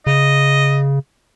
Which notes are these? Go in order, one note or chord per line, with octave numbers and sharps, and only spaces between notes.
C#3 D#5